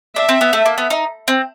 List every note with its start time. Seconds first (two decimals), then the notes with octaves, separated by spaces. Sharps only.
0.16 D4 E5
0.29 C4
0.41 B3
0.53 A3
0.65 A#3
0.78 B3
0.90 D#4
1.28 C4